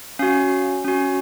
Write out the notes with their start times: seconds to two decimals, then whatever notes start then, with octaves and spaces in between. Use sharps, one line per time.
0.19 C#4 F#4 F5
0.84 C#4 F#4